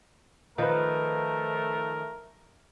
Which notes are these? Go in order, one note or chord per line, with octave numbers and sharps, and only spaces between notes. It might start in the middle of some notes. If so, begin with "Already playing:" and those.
D#3 F3 A3 F4 A#4 B4